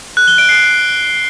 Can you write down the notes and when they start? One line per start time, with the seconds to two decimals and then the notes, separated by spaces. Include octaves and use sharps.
0.17 F#6
0.28 G7
0.38 D7
0.49 C7